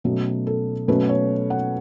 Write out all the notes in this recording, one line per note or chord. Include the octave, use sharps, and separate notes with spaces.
B2 F#3 A3 C#4
A4
B2 F#3 A3 C#4 B4
C#5
F#5